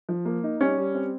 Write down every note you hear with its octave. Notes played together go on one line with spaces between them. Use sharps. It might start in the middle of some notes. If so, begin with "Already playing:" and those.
F3
A#3
D#4
G3 C#4
G3
C4